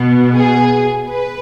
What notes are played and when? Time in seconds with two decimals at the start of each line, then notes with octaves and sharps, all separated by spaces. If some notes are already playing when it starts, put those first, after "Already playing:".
Already playing: B2 B3
0.35 G#4
1.09 B4